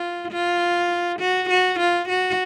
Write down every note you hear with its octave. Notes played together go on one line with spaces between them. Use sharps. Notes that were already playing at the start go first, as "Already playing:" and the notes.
Already playing: F4
F4
F#4
F#4
F4
F#4